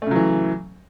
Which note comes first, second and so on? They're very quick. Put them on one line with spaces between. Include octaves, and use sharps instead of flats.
A3 C#3 F#3 E3